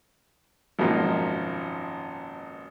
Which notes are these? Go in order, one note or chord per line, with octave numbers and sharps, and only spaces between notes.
G#1 F#2 B2 F3 A#3 D#4